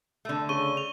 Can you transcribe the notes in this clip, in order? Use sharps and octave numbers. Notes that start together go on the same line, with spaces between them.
D3 A3
C#3 C#6 D#7 G7
F7